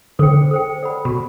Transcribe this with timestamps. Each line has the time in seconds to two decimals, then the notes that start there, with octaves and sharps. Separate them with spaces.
0.19 D3 A4 C5 G5
0.51 A4 C5 G5
0.82 A4 D5 F#5 B5
1.05 B2